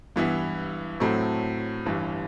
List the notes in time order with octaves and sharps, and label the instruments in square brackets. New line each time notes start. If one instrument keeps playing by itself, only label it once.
[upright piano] G2 E3 B3 E4
A2 F#3 A3 C4
G1 G2 E3